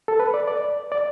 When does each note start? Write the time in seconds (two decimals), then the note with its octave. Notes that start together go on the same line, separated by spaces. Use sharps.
0.08 A4
0.20 B4
0.34 D5
0.48 D5
0.92 D5